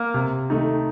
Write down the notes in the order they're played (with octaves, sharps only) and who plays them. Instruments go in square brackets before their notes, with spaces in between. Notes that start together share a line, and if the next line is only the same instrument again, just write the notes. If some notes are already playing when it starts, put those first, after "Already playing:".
Already playing: [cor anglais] A#3
[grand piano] C3
D#3 A3 D#4